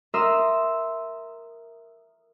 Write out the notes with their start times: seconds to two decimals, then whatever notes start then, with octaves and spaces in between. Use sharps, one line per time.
0.14 A#4 E5 C6 D#6 E6